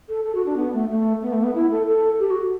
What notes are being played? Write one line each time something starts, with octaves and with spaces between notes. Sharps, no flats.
A4
A4
F#4
D4
B3
A3
A3
B3
A3
B3
E4
A4
A4
G4
F#4